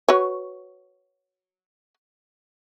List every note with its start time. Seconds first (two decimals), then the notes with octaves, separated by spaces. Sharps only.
0.08 F#4 B4 C#5